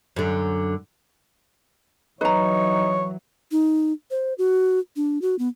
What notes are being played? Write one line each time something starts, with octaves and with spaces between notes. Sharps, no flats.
F#2 D3
E3 F#3 D#4 B4 C#5 A#5
D#4
C5
F#4
D4
F#4
B3